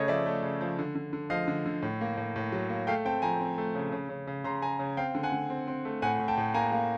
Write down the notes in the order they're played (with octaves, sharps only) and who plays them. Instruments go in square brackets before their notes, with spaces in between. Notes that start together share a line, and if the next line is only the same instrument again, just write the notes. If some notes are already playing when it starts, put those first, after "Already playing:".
Already playing: [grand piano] C#3 A3 C#5 D#5
F3 D5 E5
A3
C#3
F3
D3
D3
D3
F3 D#5 F5
D3
D3
A2
A#3
A2
A2
F#3
A#3
A3 F5 G5
C4 G5 A5
F3 G#5 A#5
C4
A3
C#3
C#3
C#3
C#3
C#3 A#5 C6
C#3 G#5 A#5
C#3
C4 F5 G5
D3
F#5 G#5
D3
C4
C4
A3
A2 F#5 G#5
A2
G5 A5
A2
A#3 G#5 A#5
A#3